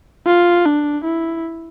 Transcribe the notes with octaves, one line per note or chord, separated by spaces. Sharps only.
F4
D4
E4